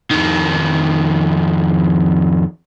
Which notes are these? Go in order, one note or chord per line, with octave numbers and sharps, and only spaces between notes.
F2 D#3